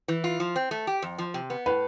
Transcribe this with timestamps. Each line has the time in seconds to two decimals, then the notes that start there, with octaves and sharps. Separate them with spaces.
0.08 E3
0.24 F4
0.40 F3
0.56 C4
0.71 A3
0.87 G4
1.02 F2
1.18 F3
1.34 C3
1.50 B3
1.66 A2 B4